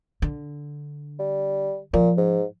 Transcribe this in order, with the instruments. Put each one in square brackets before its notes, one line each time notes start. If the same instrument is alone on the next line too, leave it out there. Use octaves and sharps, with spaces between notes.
[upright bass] D3
[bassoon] G3
[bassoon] A#2 [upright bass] F3
[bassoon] G#2